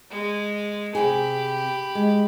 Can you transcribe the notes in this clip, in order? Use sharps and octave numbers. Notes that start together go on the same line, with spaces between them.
G#3
C3 G4 G#4 B5
G#3